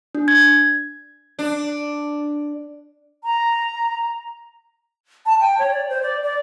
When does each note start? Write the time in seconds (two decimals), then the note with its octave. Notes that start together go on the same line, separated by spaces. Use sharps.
0.15 D4
0.28 G#6
1.39 D4
3.24 A#5
5.26 A5
5.40 G5
5.59 C#5
5.71 D5
5.89 C5
6.03 D5
6.23 D5